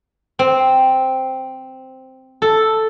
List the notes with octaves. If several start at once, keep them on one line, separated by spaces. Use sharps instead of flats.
C4
A4